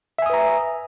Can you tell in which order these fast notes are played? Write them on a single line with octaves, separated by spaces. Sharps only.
E5 G#5 D#6 B4 A#5